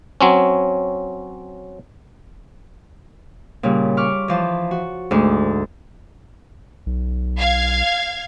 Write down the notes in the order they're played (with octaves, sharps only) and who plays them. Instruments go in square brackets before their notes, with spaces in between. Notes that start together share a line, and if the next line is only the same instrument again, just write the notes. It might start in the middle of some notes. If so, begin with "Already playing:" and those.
[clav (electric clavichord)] F#3 C4 C#4
[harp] A#2 C#3 G3
B5 C#6 D6 F6
E3 F3 A5
F#4
D2 G#2
[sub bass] B1
[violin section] F5 G#6